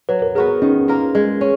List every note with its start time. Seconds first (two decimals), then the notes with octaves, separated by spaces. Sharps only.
0.09 F#3 B4
0.22 A#4
0.35 B3 F#4 G#4 A#4
0.62 D#3 C#4
0.88 A#3 F4 A#4
1.15 G#3
1.41 C#4